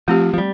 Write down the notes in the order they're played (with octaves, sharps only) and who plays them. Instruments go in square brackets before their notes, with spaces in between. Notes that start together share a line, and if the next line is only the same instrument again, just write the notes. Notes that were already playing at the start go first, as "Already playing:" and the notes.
[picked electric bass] F3 [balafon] A3 C4 G4
[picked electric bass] F3
G3